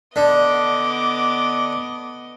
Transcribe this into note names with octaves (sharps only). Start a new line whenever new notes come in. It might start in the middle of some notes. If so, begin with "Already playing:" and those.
D3 B3 D#5 D6